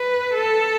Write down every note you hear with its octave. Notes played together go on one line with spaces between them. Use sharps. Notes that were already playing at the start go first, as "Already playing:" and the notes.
Already playing: B4
A4